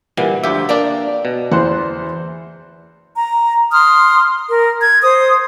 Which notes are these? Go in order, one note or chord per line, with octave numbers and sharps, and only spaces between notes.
A#2 D3 E3 G3
D2 F3 G4 E5
A#3 D4 D5 G5 A#5
B2
E2 C5 F#5
A#5
C6 D#6 F6
A#4
G#6
C5 D#6